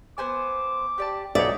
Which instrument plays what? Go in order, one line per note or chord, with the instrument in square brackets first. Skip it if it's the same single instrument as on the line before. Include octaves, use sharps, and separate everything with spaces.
[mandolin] B3 C5 G#5 [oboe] D6
[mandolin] G4 D5 A5
[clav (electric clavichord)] B1 G#2 C#5 [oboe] D#4 [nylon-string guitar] D5 [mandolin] E5